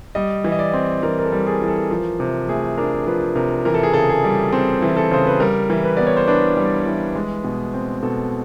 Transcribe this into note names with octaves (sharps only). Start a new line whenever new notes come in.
G3 D#5
E3
D#5
D5
C4
E3 A#4
A#4
A4
G3
G#4
E3
A4
F3 A#4
C3
A3 G#4
D4 A#4
F3 B4
C3 A#4
E3 A#4
A4
G#4
C#3 A4
G#4
G3
C4 A4
E3
A4
C#3 C5
B4
G3 A#4
E3
B4
B3 D5
C#5
C5
D4 B4
G3
E3
G#3
B2
C4
B2 A4